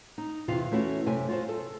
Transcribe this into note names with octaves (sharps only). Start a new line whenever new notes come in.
D#4
E2 C3 E3 F4 F5
E3 A3 C#4 E4 F#4
F#2 C3 A3 G#5
F4 F#4 C5
A4